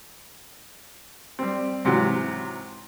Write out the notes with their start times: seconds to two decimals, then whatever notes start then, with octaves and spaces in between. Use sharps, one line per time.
1.39 G3 C4
1.85 G#2 C3 E3 F#3